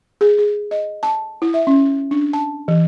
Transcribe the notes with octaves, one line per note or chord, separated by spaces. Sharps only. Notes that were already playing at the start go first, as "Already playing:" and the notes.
G#4
G#4
D#5
A5
E4
E5
C#4
D4
A5
E3